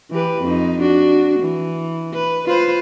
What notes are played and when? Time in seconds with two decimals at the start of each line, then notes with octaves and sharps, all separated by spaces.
0.11 E3 G4 B4
0.41 F2 D#4
0.80 D4 F#4
1.39 E3
2.13 B4
2.46 F4 B4 C5